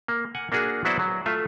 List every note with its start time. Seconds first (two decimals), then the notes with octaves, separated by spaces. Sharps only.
0.08 A#3
0.35 F#5 G#5
0.52 A#3 D4 F#4 G#4
0.85 F#3 B3 E4 F#4 C5 D5
0.99 F#3
1.26 A3 F4 E5